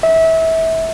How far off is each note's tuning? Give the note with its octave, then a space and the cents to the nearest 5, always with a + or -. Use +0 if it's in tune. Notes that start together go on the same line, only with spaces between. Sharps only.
E5 -25